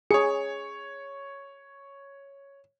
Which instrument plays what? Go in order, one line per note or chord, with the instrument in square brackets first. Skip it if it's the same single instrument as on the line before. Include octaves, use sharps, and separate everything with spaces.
[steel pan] G#4 [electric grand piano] C#5 C#7